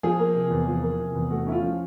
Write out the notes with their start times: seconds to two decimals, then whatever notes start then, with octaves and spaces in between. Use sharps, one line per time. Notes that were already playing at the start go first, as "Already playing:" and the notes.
0.03 F3 G#4
0.19 A#3
0.35 C3
0.50 E2
0.67 F3
0.83 A#3
0.99 C3
1.15 E2
1.30 A3 F#4
1.47 C#4 E4
1.52 F4
1.63 F3